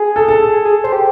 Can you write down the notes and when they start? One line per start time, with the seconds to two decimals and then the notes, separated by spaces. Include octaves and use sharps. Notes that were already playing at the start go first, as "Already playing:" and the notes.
Already playing: G#4
0.16 A4
0.28 A4
0.65 G#4
0.84 C5
0.92 G4